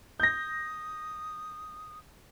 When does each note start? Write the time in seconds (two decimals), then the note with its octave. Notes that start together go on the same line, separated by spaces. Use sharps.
0.20 D#6 G6 A#6